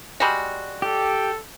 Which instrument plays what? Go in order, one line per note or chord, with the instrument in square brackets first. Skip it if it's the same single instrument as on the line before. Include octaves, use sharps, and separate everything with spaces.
[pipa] G3 G#3 F#4
[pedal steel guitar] G4 [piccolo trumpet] A4